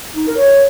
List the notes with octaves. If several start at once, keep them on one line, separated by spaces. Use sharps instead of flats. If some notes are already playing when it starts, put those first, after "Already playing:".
D#4
A#4
C#5